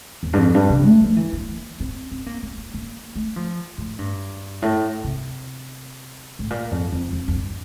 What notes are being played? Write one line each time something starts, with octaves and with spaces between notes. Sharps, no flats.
E2
G2
F2
G2
C3
A3
F3
E3
A#3
A#3
C4
C4
A#3
A#3
A#3
A#3
A3
F3
A2
G2
A2
C3
A2
A#2
F2
F2
F2
F2
G2